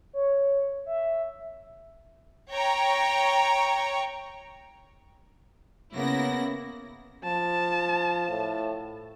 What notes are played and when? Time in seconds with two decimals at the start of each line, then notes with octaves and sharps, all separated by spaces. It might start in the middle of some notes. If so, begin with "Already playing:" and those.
0.13 C#5
0.86 E5
2.51 C#5 G5 A#5
5.94 C#3 A#3 B3 E4 A#6
7.24 F3 A5
8.29 A2